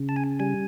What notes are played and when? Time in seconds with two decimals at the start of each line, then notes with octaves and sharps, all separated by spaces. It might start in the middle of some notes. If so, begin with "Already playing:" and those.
Already playing: C#3
0.09 A5
0.16 G#5
0.40 G3 G#5